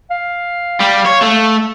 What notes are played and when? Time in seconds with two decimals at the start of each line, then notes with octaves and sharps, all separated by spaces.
0.11 F5
0.81 G3
1.06 C#5
1.22 A3